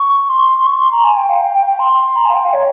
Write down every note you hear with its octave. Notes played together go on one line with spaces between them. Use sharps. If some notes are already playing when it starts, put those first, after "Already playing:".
Already playing: C#6
C6
C#6
C6
A#5
G#5
G5
F5
G5
G5
G5
C6
A#5
G#5
F5
G5
F5
C#5